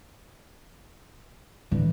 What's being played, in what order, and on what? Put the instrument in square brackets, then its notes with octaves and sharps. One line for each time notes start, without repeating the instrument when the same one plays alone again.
[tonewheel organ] A2 D3 [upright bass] E3